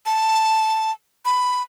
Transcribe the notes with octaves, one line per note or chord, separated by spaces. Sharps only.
A5
B5